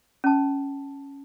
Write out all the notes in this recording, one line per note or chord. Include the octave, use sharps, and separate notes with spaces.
C#4 A5